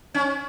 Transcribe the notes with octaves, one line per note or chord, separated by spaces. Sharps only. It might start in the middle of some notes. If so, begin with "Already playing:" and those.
C#4